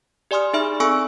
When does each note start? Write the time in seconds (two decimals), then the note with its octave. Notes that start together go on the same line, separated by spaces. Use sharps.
0.31 G4 D5 G#5 C6 D#6 F6
0.54 D#4 G#4 E5 B5 F6
0.80 C4 A4 G#5 C#6 E6 D7